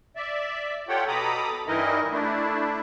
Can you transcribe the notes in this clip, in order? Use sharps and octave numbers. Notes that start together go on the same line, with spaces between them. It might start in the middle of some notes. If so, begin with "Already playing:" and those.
D5 E5
F4 G4 A4 C#5 F#5 G5
B2 A4 A#5 B5 D6 D#6
G2 E3 D#4 E4 A#4 D#5
A3 D4 E4